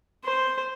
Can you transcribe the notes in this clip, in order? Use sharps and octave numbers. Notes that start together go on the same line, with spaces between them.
C5